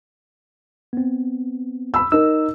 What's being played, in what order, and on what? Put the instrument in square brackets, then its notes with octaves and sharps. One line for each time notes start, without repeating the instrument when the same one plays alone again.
[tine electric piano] B3 C4
[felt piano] B5 E6
[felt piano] D#4 A#4 [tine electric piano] E6